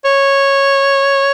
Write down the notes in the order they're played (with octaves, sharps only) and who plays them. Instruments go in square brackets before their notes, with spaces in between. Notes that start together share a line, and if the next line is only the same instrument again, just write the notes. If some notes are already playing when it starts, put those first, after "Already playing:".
[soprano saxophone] C#5